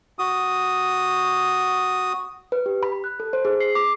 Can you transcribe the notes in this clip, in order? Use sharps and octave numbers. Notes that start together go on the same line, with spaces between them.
F#4 D#6
B4
G4
B5
F#6
A4
C5
G#4
C7
D6